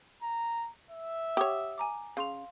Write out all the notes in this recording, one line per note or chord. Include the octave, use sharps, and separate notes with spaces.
A#5
E5
G4 C#5 F#5 D6 D#6
G#5 A#5 D6
C#3 F5 C6 F7